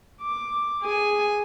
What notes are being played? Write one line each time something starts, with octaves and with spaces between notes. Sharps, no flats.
D6
G#4 G#5